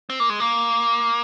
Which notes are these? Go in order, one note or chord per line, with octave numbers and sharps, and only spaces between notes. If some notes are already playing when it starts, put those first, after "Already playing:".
C4
A#3
G#3
A#3